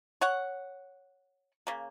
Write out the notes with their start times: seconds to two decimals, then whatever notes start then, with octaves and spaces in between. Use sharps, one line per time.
0.21 C#5 F#5
1.67 C#3 A#3